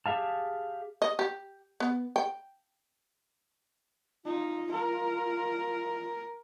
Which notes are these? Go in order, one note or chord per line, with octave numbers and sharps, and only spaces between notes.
G4 G#4 E5 F5 A5
D#5
G4
B3
G5
D#4 F4
A#4